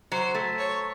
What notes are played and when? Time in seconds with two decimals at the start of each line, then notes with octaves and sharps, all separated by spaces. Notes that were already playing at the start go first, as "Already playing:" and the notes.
0.12 F#3 C5
0.35 A3
0.59 C#5